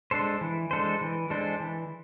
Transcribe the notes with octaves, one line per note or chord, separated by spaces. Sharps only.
G#3 D4 A4 C5
E3
G#3 D4 A4 C5
E3
G#3 D4 A4 C5
E3